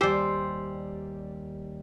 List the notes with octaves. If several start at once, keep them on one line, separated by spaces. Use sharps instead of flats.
D#2 G3 G4 C5 D5 G#5 E6 C7